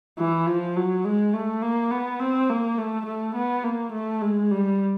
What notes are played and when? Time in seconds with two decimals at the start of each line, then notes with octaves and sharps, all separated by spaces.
0.18 E3
0.46 F3
0.76 F#3
1.04 G#3
1.33 A3
1.62 A#3
1.91 B3
2.20 C4
2.49 A#3
2.78 A3
3.06 A3
3.35 B3
3.64 A#3
3.93 A3
4.22 G#3
4.51 G3